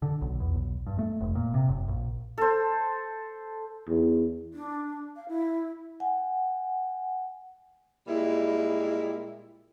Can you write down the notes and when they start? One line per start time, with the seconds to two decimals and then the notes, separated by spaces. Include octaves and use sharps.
0.02 D3
0.21 B1
0.40 E2
0.55 B1
0.87 G2
0.99 A3
1.20 F1
1.35 A#2
1.54 C3
1.68 F#1
1.88 A#1
2.38 A4 C5
3.88 E2
4.53 D4
5.16 F5
5.29 E4
6.00 F#5 G#5
8.08 A#2 G3 G#3 E4